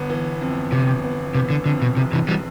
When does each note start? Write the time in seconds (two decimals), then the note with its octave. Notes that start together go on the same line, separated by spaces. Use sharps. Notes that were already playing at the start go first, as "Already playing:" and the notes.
Already playing: G1 B3
0.10 E3
0.41 F2
0.72 G1 C3
1.04 B3
1.35 C3 E3
1.50 D3
1.66 F2 D3
1.82 B2
1.97 E1 C3
2.13 C3 E3
2.28 E3 G3